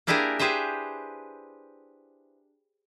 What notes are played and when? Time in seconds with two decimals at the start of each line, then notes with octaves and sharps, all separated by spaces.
0.07 A#3 D4 E4 G4 G#4 A#4
0.39 G4 G#4 B4 C5 E5